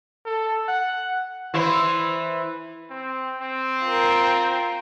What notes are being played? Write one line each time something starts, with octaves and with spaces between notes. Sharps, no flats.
A4
F#5
E3 E4 C5
C4
C4
F4 A#4